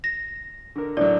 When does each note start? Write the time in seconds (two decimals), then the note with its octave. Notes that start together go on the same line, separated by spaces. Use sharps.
0.04 A#6
0.76 D3 A#4
0.97 A2 D3 F#3 D5